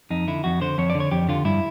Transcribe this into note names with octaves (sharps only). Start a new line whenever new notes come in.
F2 D#4
D3 E4
F2 F#4
D3 C5
F2 C#5
D5
D3
C#5
F2 G4
D3 F4
G2 E4